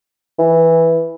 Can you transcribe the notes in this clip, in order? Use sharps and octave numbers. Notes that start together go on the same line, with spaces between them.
E3